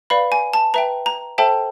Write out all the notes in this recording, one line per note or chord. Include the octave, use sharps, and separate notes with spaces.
B4 D5 F5 B5
G#5
A5
B4 E5 G5 A#5
A#5
A4 C5 E5 G5 A5